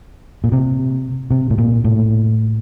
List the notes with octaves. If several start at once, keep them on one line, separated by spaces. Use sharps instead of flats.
A#2
C3
C3
A2
A#2
A2